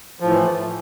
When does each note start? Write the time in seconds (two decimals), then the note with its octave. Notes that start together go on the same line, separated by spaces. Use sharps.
0.20 F3
0.25 A2
0.30 E3